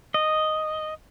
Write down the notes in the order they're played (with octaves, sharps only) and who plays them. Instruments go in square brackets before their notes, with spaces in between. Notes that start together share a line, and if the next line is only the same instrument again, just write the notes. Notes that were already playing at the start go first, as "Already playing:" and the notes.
[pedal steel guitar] D#5